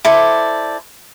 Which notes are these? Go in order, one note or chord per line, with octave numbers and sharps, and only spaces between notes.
E4 A4 C5 D5